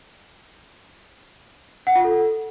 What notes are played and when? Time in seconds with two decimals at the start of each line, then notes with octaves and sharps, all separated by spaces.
1.87 F#5
1.96 F4
2.04 A4